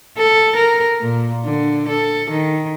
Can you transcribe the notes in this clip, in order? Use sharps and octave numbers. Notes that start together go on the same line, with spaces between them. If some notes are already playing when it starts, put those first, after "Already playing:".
A4
A#4
A#2
D3
A4
D#3